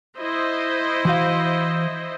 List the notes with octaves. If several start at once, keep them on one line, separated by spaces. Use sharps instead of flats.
E4 C5 D#5
E3 F#4 F5